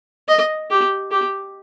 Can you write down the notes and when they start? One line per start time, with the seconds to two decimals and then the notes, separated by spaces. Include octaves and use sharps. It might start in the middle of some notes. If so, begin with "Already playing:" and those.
0.28 D#5
0.70 G4
1.11 G4